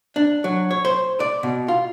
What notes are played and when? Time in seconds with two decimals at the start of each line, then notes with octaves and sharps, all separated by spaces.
0.16 D4
0.44 F#3
0.71 C#5
0.85 C5
1.20 D5
1.43 B2
1.68 F4